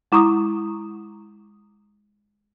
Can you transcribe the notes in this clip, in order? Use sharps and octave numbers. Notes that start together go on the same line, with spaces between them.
G#3 E4 A#5 C#6 D#6